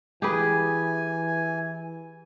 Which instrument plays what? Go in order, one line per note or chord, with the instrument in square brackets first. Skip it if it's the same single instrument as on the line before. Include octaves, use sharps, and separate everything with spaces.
[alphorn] E3 [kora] G4 G#4 B4 [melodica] G#5